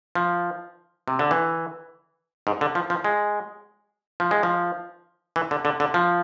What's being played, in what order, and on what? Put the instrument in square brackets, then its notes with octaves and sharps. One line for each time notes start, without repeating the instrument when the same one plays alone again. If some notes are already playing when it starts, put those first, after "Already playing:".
[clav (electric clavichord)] F3
C3
D3
E3
G#2
D3
F3
F3
G#3
F3
G#3
F3
E3
D3
D3
D3
F3